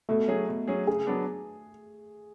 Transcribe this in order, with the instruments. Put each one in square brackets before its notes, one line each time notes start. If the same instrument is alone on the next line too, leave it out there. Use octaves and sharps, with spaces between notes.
[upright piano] B2 [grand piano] A3
[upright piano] F#3 C#4 G#4
B2
F#3 C#4 G#4
[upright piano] C#3 [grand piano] G#4
[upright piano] F#3 B3 D4